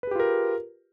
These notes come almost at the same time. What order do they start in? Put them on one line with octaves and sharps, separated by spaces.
B4 G#4 G4 F4 A#4